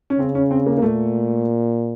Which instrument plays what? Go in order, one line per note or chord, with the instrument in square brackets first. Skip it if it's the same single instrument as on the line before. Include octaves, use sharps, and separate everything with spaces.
[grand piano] C#4
[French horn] C#3 [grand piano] C4
[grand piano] C#4
C4
A#3
A#3
[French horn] A#2 [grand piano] A3